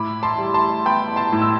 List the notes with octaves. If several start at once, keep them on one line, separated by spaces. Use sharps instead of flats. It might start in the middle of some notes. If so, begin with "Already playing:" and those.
Already playing: A2 B5 D6
A5 C6
G3
A5 C6
B3 G5 B5
A5 C6
A2
E6